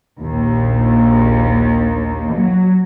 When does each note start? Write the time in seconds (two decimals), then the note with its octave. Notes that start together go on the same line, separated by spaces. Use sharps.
0.19 A#1 D#2
2.31 F#3